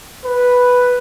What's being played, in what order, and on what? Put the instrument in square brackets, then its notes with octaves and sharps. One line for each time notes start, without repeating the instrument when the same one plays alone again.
[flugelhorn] B4